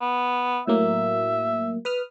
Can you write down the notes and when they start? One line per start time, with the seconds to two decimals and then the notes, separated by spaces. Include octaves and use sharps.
0.01 B3
0.67 A2 F#3 A#3 E5
1.85 B4 D#6 F6